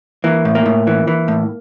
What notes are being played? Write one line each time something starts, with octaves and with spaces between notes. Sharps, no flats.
E3 A#3
A2
A#3
A2
E3
E3
A2